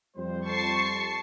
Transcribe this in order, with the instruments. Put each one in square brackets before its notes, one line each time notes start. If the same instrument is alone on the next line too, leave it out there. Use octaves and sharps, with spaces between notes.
[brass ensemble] F2 G3 C5
[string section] A5 C#6 C7